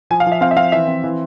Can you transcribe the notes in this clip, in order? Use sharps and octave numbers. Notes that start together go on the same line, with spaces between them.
F3 G#5
F5
F3
E5
C4 F5
E5
C4 F5
E3 E5
C4
E3